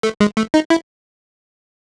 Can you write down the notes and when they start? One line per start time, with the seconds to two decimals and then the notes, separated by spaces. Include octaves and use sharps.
0.03 A3
0.20 G#3
0.37 A3
0.54 D#4
0.70 E4